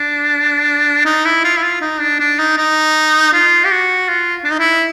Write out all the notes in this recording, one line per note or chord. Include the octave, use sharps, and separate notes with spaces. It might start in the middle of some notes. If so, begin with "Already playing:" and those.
Already playing: D4
D#4
E4
F4
E4
F4
D#4
D4
D4
D#4
D#4
F4
G4
F#4
F4
D4
D#4
E4